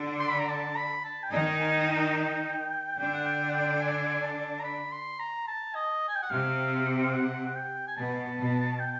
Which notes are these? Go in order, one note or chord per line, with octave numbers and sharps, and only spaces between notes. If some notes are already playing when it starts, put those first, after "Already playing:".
Already playing: D3 D4
C6
B5
A#5
A5
B5
A5
G5
D#3 D#4 G#5
G#5
G5
D3 D4 G5
F#5
G5
F#5
G5
G#5
A5
A#5
B5
C6
A#5
A5
D#5
G#5
G5
F#5
C3 C4 F5
F5
F#5
F#5
G5
G#5
B2 B3 A5
B2 B3
G5